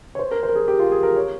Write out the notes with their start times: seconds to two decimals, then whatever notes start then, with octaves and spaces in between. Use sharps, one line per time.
0.15 C#5
0.19 C5
0.31 A#4
0.43 C5
0.49 A#4
0.55 G#4
0.68 G4
0.79 F4
0.92 G#4
1.03 A#4
1.16 C#5